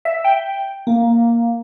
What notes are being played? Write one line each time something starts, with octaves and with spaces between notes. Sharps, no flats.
E5
G5
A#3